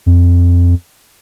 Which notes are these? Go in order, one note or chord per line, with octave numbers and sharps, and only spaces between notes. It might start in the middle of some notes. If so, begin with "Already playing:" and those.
F2